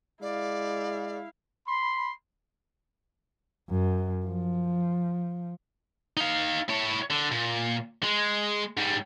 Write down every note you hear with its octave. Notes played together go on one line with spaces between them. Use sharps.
G#3 E4 D5 F5
B5 C6
F#2
F3
D#4 F5
E4 C#5
D3
A#2
G#3
G#2 G3